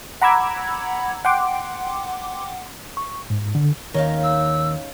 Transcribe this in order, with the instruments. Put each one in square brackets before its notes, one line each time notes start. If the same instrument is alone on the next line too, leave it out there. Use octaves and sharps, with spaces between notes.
[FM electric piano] F#5 A#5 B5 D6 E6 G#6
F#5 G5 C6 D6
[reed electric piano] C#6
G#2
D3
[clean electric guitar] D#2 D#3 A#4 [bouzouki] C#4 D#4 F5
[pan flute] E6